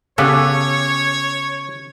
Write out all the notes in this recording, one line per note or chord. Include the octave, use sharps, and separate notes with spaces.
C#3 B3 C#4 G4 A4 B4 C#5